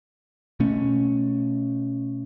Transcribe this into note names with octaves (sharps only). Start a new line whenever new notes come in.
B2 A3 C#4